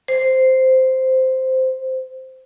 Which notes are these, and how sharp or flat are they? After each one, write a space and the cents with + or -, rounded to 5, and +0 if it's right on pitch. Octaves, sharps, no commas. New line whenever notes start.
C5 -5